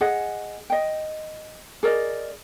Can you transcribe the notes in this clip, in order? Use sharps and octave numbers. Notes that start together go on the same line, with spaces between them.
G#4 D#5 F#5
D#5 G5
G#4 A#4 D5 D#5